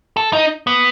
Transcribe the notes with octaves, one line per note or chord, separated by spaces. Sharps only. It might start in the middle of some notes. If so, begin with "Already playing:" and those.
A4
D#4
B3